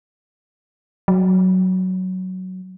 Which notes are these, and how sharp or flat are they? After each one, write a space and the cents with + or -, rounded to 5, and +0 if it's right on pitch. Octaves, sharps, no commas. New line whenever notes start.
F#3 +5